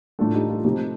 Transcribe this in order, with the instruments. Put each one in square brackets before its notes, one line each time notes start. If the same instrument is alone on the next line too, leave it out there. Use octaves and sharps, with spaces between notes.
[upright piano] A2 A3 D4 F4 A4
D#4 G4
F4 A4
C3 F3 A3 D#4